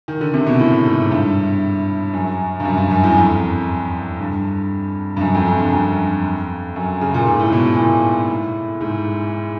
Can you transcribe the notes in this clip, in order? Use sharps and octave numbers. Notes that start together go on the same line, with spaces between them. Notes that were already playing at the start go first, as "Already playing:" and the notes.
D#3
D3
C3
B2
A2
G#2
G2
F#2
G2
F#2
G2
F#2
E2
F2
G2
G2
F#2
F2
F2
G2
F2
F#2
C#3
A#2
G#2
A2
B2
A#2
A2
G#2